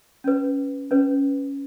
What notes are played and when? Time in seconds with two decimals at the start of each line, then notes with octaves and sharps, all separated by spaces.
0.24 C#4 B4
0.91 C#4 B4